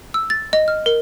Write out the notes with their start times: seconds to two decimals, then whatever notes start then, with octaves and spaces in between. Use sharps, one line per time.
0.14 E6
0.30 A6
0.53 D#5
0.68 F6
0.86 A#4